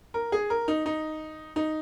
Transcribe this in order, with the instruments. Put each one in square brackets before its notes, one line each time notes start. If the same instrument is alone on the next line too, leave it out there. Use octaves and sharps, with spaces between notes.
[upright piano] A#4
G#4
A#4
D#4
D#4
D#4